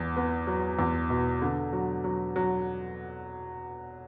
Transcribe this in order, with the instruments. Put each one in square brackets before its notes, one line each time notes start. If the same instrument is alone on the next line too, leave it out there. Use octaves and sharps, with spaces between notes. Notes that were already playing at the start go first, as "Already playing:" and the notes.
Already playing: [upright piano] E2
B3
F#3
E2
B2
D3
F#3
F#3
F#3